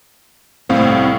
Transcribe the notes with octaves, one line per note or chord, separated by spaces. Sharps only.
C2 A2 C4 F5